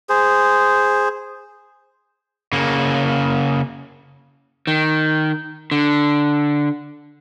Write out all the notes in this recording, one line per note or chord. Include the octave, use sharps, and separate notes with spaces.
G#4 C5
C#3 A#3
D#3
D3